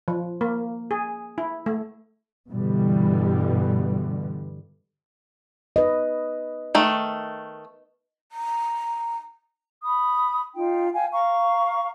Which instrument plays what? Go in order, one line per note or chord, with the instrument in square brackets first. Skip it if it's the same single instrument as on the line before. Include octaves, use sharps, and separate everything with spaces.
[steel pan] F3
A#3
G#4
E4
A3
[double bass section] G2 B2 D3 E3 G3
[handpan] B4 D#5
[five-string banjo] D#3 A3
[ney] A#5
[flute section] B5 D#6
D#4 F4 G5
F5 G5 G#5
F5 A#5 C#6